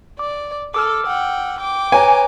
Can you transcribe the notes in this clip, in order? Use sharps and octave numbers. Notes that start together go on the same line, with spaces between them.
D5 D6
A4 D6 E6 F6
F#5 G5
G5 D6
B4 C#5 G#5 A#5